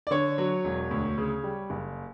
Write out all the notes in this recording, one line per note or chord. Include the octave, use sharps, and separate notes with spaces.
D5
D3 C#5
F#3
E1
D2
C#3
G3
F#1